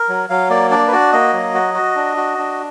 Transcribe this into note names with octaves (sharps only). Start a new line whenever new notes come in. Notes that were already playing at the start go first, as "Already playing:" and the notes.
Already playing: A#4
F#3
F#3 F5
A#3 D5
D4 D5
B4
F#4 D5
A#3 D#5
F#3
F#4
F#4
D4
F#4
D4